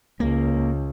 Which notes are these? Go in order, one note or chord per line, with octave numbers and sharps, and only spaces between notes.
C#2 A#3